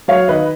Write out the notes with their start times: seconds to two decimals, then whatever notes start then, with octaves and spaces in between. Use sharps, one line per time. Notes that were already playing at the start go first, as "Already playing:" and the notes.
0.08 F#3 C#5 F5
0.28 D#3 B4 D#5